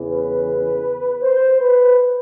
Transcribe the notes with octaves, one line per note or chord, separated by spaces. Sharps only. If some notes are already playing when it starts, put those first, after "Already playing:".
Already playing: E2 C#3 E3
B4
C5
B4